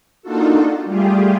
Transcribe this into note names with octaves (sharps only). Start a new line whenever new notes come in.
A#3 D4 D#4 F4 F#4 A4
G3 A3 F4 G4 G#4